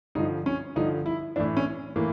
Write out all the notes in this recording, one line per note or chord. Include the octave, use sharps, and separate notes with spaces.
G2 D3 F3 D#4
C#4
G2 D3 F3 D#4
E4
A2 E3 D4
C#4
A2 E3 A#3